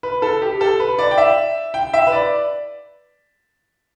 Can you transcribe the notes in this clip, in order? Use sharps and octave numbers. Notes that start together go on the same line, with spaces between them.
B4
A4
G4
A4
B4
D5
G5
E5
G5
E5
B4
D5